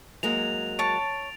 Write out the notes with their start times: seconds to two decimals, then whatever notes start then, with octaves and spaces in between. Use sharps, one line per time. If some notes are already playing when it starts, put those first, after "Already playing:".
0.23 F#3 G#3 A#3 F7
0.79 C#5 A5 A6 D7